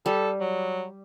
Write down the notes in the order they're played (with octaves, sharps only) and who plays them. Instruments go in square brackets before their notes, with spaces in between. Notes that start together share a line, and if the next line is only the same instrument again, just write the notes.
[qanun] G3 [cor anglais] A4
[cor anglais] F#3